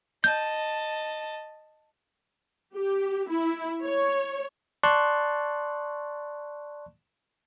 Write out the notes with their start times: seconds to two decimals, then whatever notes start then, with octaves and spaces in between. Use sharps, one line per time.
0.24 D#5 A5 G6
2.74 G4
3.30 E4
3.82 C#5
4.84 D5 A5 C6 C#6 F#6